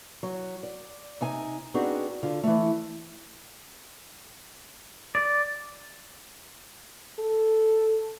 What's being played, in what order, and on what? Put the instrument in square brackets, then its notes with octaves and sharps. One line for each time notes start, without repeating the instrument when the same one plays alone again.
[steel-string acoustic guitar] F#3
D5
C3 D#4 G#5
B3 C4 D4 D#4 F#4 G#4
D3 F4
E3 A3
[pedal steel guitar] D5
[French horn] A4